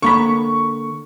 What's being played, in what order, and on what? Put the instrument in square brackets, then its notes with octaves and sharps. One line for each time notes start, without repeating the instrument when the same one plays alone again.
[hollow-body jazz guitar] D3 A#3 B5 [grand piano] C#6